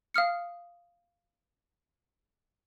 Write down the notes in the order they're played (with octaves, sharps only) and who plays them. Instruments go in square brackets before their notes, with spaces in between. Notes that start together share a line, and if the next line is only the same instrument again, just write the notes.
[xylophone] F5 D#6 F6 C#7